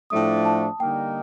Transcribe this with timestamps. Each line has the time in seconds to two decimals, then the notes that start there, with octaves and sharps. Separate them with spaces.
0.10 A2 F3 A3 D4 D#6
0.45 A5
0.80 D3 G3 A#3 D#4 G5